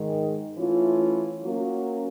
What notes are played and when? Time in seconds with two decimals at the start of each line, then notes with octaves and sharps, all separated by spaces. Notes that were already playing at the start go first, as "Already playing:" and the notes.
Already playing: G#2 D#3 G#3
0.57 E3 A3 C#4 F4
1.44 F#3 A#3 C#4